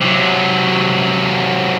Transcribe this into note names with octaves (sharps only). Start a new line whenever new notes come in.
C3 F#3